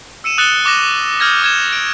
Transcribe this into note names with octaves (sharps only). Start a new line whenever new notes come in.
E6 C#7 D#7 E7
D#6 F#6 A6 C#7 E7 G7
C#6 D6 F#6 A#6 E7
D#6 F6 G6 G#6 A#6
D6 G#6 E7
D7